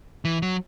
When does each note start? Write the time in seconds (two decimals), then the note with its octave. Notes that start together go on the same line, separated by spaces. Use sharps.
0.25 E3
0.42 F#3